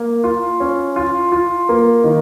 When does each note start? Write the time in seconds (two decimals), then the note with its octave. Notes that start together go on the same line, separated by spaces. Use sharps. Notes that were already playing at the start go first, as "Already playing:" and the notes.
Already playing: A#3
0.24 F4
0.60 C#4
0.96 F4
1.32 F4
1.69 A#3
2.04 D#3